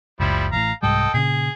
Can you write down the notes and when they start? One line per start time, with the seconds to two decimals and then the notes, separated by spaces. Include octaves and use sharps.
0.20 F#1 C#2 F3 G3 E4
0.52 A1 A2 F5 A#5
0.83 C2 G#2 G3 A4 D#5 G5
1.14 A#2 C#3 G#4